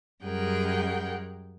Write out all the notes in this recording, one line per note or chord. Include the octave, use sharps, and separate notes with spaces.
F#2 G3 G#4 A#4 F#5 G5